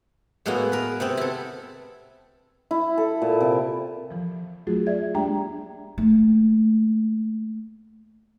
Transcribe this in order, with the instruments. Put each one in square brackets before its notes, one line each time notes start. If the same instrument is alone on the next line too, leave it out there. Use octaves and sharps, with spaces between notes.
[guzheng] A2 G#3 A#3 B3 E4 F#4
A#4 B4
C3 B3 C4
E4 A4
[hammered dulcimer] E4
A4
A#2
C3
[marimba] E3 F3
F#3 A3 F4 F#4 G#4
G#4 D5 E5 G#6
G#3 A#3 D4 G4 G5 A#5
[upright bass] A3 A#3